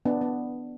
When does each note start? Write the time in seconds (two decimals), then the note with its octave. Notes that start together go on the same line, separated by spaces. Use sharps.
0.05 B3 D4
0.21 B3